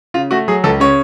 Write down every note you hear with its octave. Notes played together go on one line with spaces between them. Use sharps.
C#3 F4
A3 F#4
F#3 G#4
C#2 A4
C#3 C#5